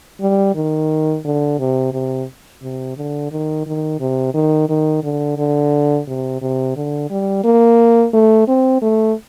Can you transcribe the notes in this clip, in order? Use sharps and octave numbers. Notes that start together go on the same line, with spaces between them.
G3
D#3
D3
C3
C3
C3
D3
D#3
D#3
C3
D#3
D#3
D3
D3
C3
C3
D3
G3
A#3
A3
C4
A3